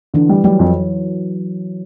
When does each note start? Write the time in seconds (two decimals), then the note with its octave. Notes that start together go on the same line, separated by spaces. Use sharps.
0.14 D3 E3
0.29 G3
0.44 F#3 G3
0.59 F2